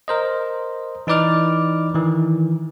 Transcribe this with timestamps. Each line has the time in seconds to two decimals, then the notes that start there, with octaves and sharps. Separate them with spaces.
0.08 A#4 C5 D#5
1.07 E3 D#4 B4 D5 D6 F6
1.94 D#3 E3